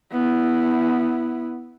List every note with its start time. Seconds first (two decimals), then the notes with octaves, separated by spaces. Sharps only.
0.12 B3 E4